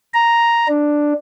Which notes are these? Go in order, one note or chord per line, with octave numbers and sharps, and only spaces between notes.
A#5
D4